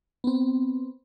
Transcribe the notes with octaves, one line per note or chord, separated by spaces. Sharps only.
B3 C4